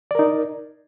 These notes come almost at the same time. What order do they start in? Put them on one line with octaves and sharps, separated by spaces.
D5 A#4 D#4